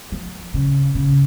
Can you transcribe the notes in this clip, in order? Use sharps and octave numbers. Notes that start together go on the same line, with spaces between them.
F3
C#3
C#3